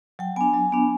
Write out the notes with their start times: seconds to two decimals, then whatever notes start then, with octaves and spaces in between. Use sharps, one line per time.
0.19 F#3 G5
0.36 B3 D4 G#5
0.54 F#3
0.72 B3 D4